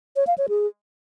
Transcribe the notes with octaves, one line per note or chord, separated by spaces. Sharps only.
C#5
F5
C#5
G#4